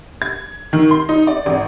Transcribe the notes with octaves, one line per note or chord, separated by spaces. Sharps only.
G#6
D#3
C6
D#4
D5
G#1